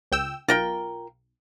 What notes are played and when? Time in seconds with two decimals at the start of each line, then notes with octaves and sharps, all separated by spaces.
0.12 C#2 G5 E6
0.48 B1 F4 A#4 G5